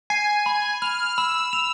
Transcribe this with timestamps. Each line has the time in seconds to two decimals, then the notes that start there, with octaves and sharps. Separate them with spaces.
0.10 G#5 C7
0.46 B5
0.82 B5 F6
1.18 B5 E6
1.53 F7